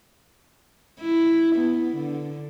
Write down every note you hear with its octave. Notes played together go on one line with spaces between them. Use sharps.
E4
B3
D3